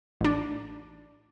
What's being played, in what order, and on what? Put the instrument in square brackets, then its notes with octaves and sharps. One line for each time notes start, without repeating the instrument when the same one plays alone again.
[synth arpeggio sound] A1 D4